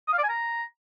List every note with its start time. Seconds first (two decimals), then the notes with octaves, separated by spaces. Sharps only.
0.08 D#6
0.13 F5
0.18 D5
0.24 G#5
0.29 A#5